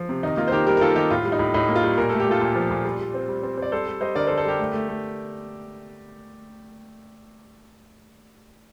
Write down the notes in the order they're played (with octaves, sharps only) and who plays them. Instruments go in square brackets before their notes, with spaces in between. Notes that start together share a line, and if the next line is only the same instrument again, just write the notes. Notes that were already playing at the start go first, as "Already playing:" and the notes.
Already playing: [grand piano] F3
C3
D#3 D#4
A#3 F4
C5
D#3 G4 A#4
G3 G4 A#4
A#4
D#3 F4 A4
D#3 D#4 G4
A2 F4
G3
D#4
A2
A2 D#4
A#3
F4
G3
A#2 A#4
A3 A4
G4
A3 F4 A4
A#2
F3
A#2
G3
G3
C4
G3
C4
C4
D5
G3 A4 C5
G3
G3 C5 D#5
D3 A#4 D5
A4 C5
D3
A4 C5
G3 G4 A#4
A3
A3
A3